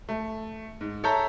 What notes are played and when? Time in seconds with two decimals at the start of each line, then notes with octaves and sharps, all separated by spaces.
0.09 A3
0.81 G#2
1.04 A4 C#5 E5 A5 A#5 G6